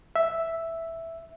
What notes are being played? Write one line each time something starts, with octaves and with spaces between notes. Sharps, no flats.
E5